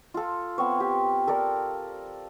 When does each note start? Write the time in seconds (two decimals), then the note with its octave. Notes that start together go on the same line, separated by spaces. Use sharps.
0.14 F4 A4
0.58 B3 C4 C#5
0.80 G4
1.27 A4 A#4 D5